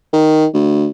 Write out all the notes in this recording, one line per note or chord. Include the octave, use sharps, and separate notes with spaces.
D#3
D2